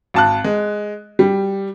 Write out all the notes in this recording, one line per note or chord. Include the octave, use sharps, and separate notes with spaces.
G#1 A5 F#6
G#3
G3